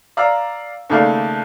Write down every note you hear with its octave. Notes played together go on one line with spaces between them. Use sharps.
D5 F5 A#5 E6
D#2 C#3 A3 A4 D5 F5